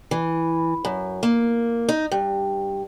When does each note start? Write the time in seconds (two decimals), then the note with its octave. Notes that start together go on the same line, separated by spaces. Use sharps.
0.11 E3
0.85 F#2
1.23 A#3
1.89 D#4
2.11 G2